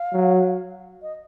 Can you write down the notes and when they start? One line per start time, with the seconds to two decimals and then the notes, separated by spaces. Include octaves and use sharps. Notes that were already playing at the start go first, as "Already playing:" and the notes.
Already playing: F5
0.13 F#3
1.02 D#5